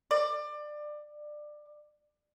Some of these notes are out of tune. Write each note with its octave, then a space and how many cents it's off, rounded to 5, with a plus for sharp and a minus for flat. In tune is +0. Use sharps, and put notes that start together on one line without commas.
D5 +20